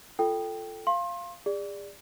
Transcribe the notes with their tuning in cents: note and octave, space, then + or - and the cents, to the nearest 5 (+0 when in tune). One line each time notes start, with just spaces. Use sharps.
F4 -10 A4 +0 G5 +0
F5 -10 C6 +30
G#4 -40 D5 +0